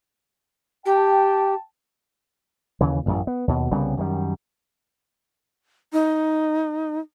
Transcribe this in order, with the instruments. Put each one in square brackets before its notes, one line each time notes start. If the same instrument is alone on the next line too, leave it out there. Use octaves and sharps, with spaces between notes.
[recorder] G4 [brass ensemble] G5 A5
[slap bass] D#2 C#3 E3
A1 F#2 A#2
B3
D#2 B2
C2 C#3 G3 B3
F#2 D#3 G3
[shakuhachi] D#4